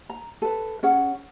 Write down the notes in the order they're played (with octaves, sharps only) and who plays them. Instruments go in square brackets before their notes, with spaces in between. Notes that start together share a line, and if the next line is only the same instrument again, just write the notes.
[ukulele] A#5
A4 B4
C#4 G#4 F#5